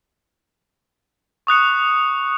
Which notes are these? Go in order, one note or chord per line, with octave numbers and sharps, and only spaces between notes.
C#6 D#6 F#6 C#7